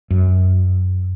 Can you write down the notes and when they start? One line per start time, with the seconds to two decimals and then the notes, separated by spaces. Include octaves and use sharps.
0.10 F#2